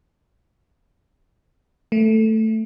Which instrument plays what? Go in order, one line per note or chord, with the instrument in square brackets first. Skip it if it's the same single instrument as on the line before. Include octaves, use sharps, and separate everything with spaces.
[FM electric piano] A3